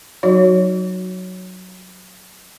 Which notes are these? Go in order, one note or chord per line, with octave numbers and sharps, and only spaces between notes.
F#3 D#4 F#4 C#5